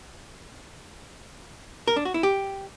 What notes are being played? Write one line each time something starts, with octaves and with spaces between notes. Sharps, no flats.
A#4
D4
F#4
E4
G4